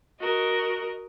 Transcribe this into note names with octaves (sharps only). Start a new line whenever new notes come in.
F#4 A#4 D#5